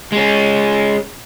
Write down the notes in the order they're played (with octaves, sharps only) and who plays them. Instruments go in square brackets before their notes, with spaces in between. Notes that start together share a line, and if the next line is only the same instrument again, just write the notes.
[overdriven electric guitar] G#3 C#4